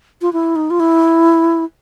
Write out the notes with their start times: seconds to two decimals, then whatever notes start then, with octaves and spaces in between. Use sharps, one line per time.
0.22 F4
0.33 E4
0.56 D#4
0.70 F4
0.80 E4